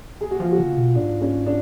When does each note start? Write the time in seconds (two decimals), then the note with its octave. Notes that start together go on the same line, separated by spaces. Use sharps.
0.21 G#4
0.31 F#4
0.40 F3 F4
0.52 F#4
0.59 C#3
0.77 B2
0.96 G#2 D4
1.21 C#4
1.47 D4